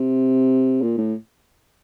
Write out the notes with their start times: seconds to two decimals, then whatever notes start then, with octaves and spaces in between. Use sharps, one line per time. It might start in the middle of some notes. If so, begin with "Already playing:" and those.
Already playing: C3
0.82 A#2
0.97 A2